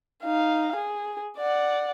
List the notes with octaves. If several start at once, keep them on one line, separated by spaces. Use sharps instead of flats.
D#4 F5
G#4
D5 F#5